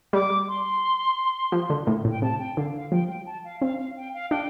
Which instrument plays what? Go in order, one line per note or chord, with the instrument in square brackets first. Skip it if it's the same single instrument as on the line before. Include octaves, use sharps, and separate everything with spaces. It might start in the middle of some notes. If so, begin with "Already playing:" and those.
[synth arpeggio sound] G3 [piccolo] D6
[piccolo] C6
[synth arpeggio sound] F3
D3
A2
A2
[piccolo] G5
[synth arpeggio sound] C3 [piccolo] A5
[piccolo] G5
[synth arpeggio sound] D3 [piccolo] F5
[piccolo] F5
[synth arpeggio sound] F3 [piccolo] G5
[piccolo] G5
A5
F5
[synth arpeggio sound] C4 [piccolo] F5
[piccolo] F5
G5
F5
[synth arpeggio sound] D4 [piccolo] G5